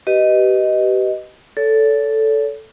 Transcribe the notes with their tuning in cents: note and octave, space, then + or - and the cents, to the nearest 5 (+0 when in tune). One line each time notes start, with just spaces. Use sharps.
G4 -30 B4 +0 D#5 +0
A4 +0 C#5 +45